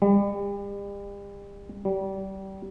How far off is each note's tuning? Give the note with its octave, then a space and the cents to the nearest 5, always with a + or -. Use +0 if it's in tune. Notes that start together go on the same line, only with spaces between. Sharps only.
G3 +40
G3 -25